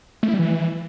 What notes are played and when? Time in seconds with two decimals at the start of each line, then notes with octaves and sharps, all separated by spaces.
0.23 A3
0.28 E4
0.34 G3
0.39 E3